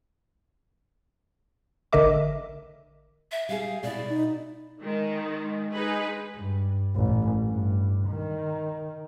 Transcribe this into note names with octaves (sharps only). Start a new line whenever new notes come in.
A1 D3 A#4 D#5 E5 D6
E5
G3 G#4 F5
B2 E4 D5
D#4
D#3 G#3
G#3
D#4 G#4 B4
G2
A1
G2
D#3